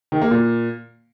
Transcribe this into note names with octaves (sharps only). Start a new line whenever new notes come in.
D#3
A#3
A#2